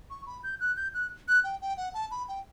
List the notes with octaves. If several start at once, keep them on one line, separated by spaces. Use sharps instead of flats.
C#6
B5
G6
F#6
G6
F#6
F#6
G5
G5
F#5
A5
B5
G5